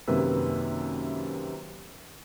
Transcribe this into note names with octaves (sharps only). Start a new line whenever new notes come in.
F#2 C3 D#3 A#3 B4 E6